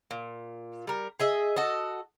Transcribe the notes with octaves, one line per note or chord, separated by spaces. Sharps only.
A#2
G3 A#4
G#4 D#5 E5
F#4 A4 D#5